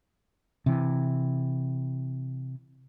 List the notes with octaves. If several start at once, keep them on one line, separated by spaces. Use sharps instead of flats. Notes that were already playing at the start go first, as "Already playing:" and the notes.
C3 E3